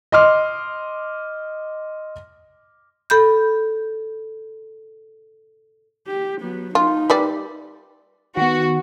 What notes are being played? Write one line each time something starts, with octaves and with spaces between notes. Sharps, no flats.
D#5 C6 D6 F6
A4 B5 G6
G4
F#3 B3
D#4 F4
G3 B4 D5
D#3 B3 F#4